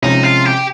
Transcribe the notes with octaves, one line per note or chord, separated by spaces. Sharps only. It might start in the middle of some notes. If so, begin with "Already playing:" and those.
C3 F3 G#3 C#4 D#4
F4
G4